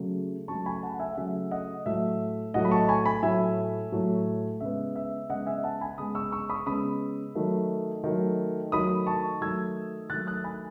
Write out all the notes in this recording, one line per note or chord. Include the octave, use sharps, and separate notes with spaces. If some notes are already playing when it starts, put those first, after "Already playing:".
Already playing: C#3 F#3 A3
C#3 F#3 A3 A5 C#6
G#5 B5
F#5 A5
F#5
E5 G#5
F#5
C#3 F#3 A3 E5
D#5 F#5
A2 F#3 A3 E5
A2 F#3 A3 D#5 F#5
B5
A5 C#6
G#5 B5
G#5 B5
A2 F#3 A3 E5 G#5
A2 F#3 A3
C#3 G#3 B3 E5
E5
C#3 G#3 B3 D#5 F#5
E5 G#5
F#5 A5
G#5 B5
C#3 G#3 B3 B5 D#6
C#6 E6
C#6 E6
B5 D#6
C#3 G#3 B3 B5 D#6
D#3 F#3 A3
D#3 F#3 A3
D#3 F#3 A3 B5 D#6
A5 C#6
D#3 F#3 A3 E6 G#6
D#3 F#3 A3 F#6 A6
D#6 F#6
G#5 B5